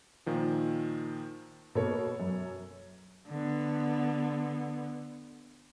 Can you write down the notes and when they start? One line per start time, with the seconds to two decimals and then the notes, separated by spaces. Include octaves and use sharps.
0.26 A#2 D#3 F3
1.75 B2 A#3 A4 C#5
2.20 F#2
3.28 D3 B3